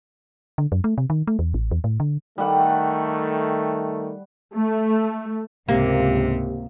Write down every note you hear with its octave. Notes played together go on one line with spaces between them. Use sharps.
D3
F#2
A3
C3
D#3
A3
E2
A1
E2
A2
D3
D#3 G3 A3 F#5
A3
C#2 G#2 C3 A#3 G4